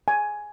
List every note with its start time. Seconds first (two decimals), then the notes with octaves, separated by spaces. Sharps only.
0.08 G#5